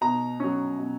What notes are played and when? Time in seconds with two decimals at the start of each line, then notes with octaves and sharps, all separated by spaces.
0.01 B2 A#5
0.40 F#3 C#4
0.78 B2